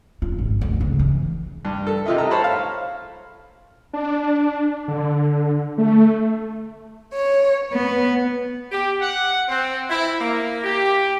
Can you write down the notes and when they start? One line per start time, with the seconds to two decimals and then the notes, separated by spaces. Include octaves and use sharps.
0.22 F4
0.39 G#1
0.61 D2
0.81 C#2
0.99 E3
1.65 G2
1.87 A4
2.06 C3 D#4 F4 D#5 E5
2.18 A4 A#5
2.31 C5 C#5 A5 B5
2.44 F5
3.93 D4
4.88 D3
5.78 A3
7.14 C#5
7.71 B3
8.72 G4
9.02 F#5
9.48 C4
9.89 E4
10.20 A#3
10.64 G4